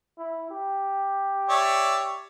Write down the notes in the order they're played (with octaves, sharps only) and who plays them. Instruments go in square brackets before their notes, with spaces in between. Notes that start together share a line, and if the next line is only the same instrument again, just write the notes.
[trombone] E4
G4
[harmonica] C#5 D5 E5